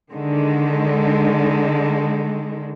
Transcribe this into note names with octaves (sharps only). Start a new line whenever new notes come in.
D3 D#3 G#3